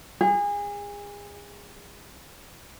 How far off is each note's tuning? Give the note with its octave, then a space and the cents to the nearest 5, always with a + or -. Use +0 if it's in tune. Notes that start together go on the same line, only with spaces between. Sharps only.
G#4 -30